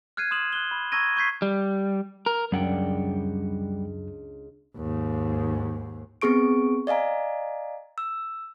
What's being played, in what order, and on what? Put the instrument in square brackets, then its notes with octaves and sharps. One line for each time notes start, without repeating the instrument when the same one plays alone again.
[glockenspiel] F6 F#6 G#6 C7 D#7
C6 D#6 E7 F#7
F#6 G7
B5
A#5 C#6 E6 G#6 A#6 D#7
C#6 G6 G#6 B6 C7
[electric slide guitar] G3
A#4
[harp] C#2 D4 [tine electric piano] F#2 [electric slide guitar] G3 F#5 G5
[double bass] D#2 G#2
[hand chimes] B3 C4 G#4 C#6 D7
D5 D#5 F5 G#5 A#5
E6